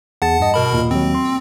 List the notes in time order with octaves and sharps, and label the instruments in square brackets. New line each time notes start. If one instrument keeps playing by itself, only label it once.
[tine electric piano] E2 G#4 A6 [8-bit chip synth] F#5 A5
[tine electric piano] G2 D#5
[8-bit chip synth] B2 A#4 B5
[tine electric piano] D#2 A#2
[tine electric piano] D#2 F#3 [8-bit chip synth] C4
[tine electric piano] C6